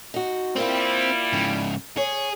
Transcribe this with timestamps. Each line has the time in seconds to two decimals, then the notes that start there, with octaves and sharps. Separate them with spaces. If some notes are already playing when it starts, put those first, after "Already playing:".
0.14 D#4 F#4
0.56 G3 A#3 C4 E4 F4
1.33 G#2 C#3
1.97 G#4 C#5